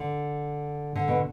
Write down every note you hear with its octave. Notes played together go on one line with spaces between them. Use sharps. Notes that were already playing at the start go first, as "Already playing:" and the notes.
Already playing: D3
D3
B2